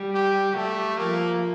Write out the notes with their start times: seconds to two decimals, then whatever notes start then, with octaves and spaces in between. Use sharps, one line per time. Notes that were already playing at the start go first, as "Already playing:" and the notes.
Already playing: G3
0.14 G4
0.55 G3 A3
0.98 F3 A#3